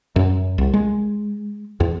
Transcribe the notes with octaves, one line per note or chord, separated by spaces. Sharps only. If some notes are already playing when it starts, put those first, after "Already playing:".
F#2
C2
G#3
E2